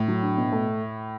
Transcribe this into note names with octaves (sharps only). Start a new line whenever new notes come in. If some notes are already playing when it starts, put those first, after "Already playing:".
Already playing: A2
F#3
D4
B2
A3